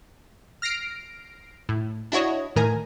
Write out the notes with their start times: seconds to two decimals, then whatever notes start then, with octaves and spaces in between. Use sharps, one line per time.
0.62 F6 A#6 C7 D7
1.69 A2
2.12 D4 E4 F#4 C#5 D#5
2.56 A2 D#3 A#4 G#5